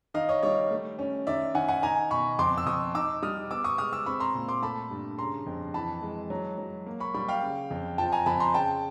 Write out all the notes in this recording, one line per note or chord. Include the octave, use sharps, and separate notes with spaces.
D#3 D#5 F5
C#5 D#5
G3 C#5 D#5
A3
C#4
D#3 D5 E5
D#3 F#5 G#5
F#5 G#5
D#4 G#5 A#5
B2 B5 C#6
F2 C6 D6
E6
F2 C#6 D#6
D#4 D6 E6
G3 D#6 F6
B3 D6 E6
C#6 D#6
G#3 D#6 F6
D6 E6
C4 B5 C#6
A#5 C6
A#2
C6 D6
A3 A5 B5
G2
C#3 A#5 C6
F2
E3 A5 B5
G#3
F#3
F#3
A#3
B5 C#6
G3 B5 C#6
F5 G5
C#3
F2
F3 G5 A5
G#5 A#5
F2 A5 B5
A#5 C6
C#3 G5 A5